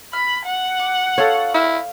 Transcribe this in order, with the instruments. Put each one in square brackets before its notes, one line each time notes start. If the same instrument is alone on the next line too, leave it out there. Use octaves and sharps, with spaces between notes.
[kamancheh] B5 [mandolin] F6
[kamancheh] F#5
[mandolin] D6
[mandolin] C#4 F4 F5 [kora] A4 C#5
[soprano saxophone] E4 [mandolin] F5 F6